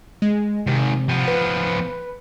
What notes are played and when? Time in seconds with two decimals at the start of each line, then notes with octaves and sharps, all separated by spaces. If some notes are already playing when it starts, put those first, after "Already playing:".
0.22 G#3
0.67 G#2 C3 D#3
1.09 F3 B3
1.28 B4